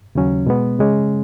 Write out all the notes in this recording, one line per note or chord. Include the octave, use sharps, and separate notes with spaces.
D#2 C#3 F#3 C#4
B2 G#3 B3
C#3 G#3 C#4